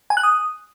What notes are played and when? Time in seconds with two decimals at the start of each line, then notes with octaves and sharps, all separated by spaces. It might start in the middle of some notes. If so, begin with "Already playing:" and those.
0.10 G#5
0.17 F#6
0.23 D#6